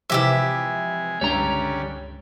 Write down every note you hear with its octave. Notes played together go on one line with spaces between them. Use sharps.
C3 E3 F3 G#3 E4 G4 E5
C#2 G2 D3 G3 C#4 C#5 A#5